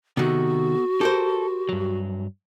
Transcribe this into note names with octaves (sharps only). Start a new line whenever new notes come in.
C3 D#3 B3 F#4 A4 F#5
G4 A4 A#4 C5
G2 F#3